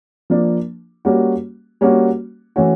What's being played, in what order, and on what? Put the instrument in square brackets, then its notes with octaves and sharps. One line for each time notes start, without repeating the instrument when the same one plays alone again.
[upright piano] F3 A#3 D4
G3 A#3 C#4 F#4
G3 A#3 C#4 F#4
E3 A3 C#4 F#4